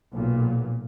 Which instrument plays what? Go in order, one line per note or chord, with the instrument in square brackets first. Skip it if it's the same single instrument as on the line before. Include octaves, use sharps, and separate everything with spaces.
[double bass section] B1 A#2